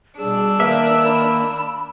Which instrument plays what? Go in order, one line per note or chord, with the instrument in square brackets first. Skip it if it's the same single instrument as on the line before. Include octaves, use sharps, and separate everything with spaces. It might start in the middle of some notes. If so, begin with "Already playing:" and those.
[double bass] B2 G3 [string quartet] D4 E6 [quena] G#4
[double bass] D#3 [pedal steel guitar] A#3 E5 [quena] B4
[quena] B5